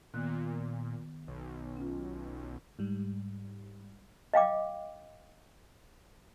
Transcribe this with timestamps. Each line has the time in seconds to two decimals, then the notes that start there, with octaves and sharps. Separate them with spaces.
0.14 A#2 D#3 B3 F#6
1.28 B1
1.77 C#4 F4
2.79 G#2 G3
4.34 D#5 F5 G5 D6